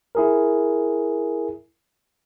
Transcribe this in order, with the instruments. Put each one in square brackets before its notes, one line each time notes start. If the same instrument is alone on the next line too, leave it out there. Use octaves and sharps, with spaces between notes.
[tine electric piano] E4 G#4 A#4